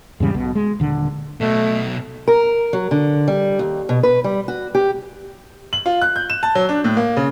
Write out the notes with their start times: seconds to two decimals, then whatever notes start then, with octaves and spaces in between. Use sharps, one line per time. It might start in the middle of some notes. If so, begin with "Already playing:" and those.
0.20 E2 G#2 C#3 G3
0.34 B1 B2
0.55 G#3
0.80 D#1 D3
1.40 B1 B2 A3
2.28 A#4
2.73 F#3
2.91 D3
3.28 G3
3.59 D#2
3.89 B2
4.03 B4
4.24 G3
4.48 F#4
4.75 G4
5.73 F#7
5.86 F4
6.02 F#6
6.16 G6
6.30 E7
6.43 A5
6.55 F#3
6.69 D4
6.84 A2
6.97 A#3
7.17 C#3